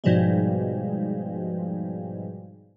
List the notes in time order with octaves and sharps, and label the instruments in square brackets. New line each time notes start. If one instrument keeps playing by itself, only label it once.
[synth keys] G#2 B2 F3 G3 G#3